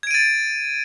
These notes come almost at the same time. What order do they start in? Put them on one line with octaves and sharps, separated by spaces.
G#6 D7 D#7 A6